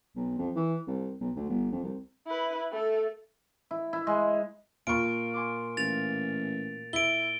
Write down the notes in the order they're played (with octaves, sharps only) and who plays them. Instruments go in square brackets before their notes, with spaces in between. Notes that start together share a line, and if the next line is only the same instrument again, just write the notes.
[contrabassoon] B1
F2
E3
C2
B1
D2
G1
F2
C2
[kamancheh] E4 B4
A3 A4
[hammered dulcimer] E4
E4
G#3
[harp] A#2 [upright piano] F4 C#6 [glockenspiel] D7
[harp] G#5 C6 D6
[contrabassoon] A1 [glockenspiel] A6 F7
[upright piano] E4 [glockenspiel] D7 G7